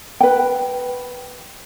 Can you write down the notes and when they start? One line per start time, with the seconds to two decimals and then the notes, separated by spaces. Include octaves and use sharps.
0.20 B4 G5